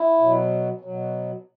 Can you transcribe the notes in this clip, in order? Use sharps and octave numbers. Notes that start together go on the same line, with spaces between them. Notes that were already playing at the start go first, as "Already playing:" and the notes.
Already playing: E4
B2 F#3
B2 F#3